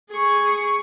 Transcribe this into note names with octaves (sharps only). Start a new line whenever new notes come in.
G#4 C#6